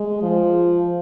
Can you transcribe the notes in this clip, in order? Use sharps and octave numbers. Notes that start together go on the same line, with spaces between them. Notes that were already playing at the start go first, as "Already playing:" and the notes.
Already playing: G#3
F3